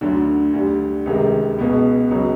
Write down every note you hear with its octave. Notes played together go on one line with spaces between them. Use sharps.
D2 D3 F#3
D2 D3 G3
C#2 C3 D#3 G#3
C#2 B2 G#3 B3
C#2 C#3 F#3